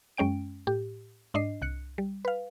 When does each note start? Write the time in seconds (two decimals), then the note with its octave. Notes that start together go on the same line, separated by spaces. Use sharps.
0.17 F#2 G#3 C#4 G5 D7
0.67 A2 G4
1.34 G#2 D4 D#5 C7
1.62 C2 F#6 C#7
1.98 G3
2.25 B4 F5